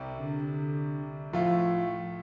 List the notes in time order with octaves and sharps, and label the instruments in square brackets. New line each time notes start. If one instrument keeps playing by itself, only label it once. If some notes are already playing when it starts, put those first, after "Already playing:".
Already playing: [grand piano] C2 C3 G3
[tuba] D3
[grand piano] A2 A3 F4 [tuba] F3